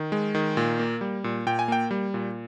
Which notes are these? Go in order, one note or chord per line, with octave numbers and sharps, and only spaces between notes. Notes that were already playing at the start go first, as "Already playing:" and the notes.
Already playing: D#3
G#3
D#3
A#2
A#3
G3
A#2
A#2 G5
G#5
A#3 G5
G3
A#2